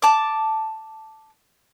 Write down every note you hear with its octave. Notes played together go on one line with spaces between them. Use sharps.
A5 D6